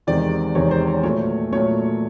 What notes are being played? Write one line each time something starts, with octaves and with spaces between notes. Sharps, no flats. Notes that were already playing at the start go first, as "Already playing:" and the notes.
E2 C3 D#3 G#3 C4 D5
E2 C3 D#3 G#3 C4 C#5
C5
C#5
A#2 F#3 A3 C#5
A#2 F#3 A3 C#5